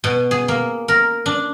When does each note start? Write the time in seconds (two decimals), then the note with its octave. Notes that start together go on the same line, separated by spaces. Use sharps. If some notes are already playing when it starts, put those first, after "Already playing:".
0.04 B2
0.31 G#4
0.48 A#3
0.88 A#4
1.26 D4